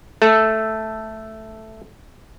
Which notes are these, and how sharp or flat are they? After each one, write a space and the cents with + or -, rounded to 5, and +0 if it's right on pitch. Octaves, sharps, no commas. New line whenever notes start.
A3 +0 A4 +0